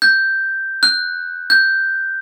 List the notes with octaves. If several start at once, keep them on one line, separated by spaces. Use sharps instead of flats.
G6
F#6
G6